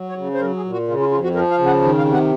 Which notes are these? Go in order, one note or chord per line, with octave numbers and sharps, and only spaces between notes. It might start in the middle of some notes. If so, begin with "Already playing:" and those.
Already playing: F#3
C#5
C#3
C5
F#3 A#4
G#4
A#2
F#4
C#3 F4
F4
F2 F4
F#4
F3 A#4
F5
C#3
F#5
D#3
F5
C3
F#5